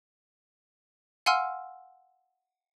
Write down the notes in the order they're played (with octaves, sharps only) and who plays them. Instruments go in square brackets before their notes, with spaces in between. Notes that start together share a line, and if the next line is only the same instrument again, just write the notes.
[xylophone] F5 F#5 G#5 C6 E6 F6